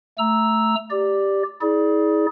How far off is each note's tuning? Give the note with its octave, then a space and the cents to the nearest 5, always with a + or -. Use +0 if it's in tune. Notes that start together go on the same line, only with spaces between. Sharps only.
A3 +0 A#5 +0 E6 -5
G4 +0 D5 +0
E4 -40 G#4 +20 D5 +0